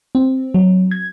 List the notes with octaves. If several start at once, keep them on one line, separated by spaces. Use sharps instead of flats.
C4
F#3
G#6